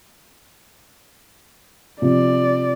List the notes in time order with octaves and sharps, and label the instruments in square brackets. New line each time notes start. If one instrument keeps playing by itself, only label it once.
[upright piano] C3 F3 [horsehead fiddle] D5